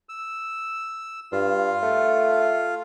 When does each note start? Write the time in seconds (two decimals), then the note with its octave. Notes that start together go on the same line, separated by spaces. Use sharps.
0.09 E6
1.32 G2 F4
1.83 A3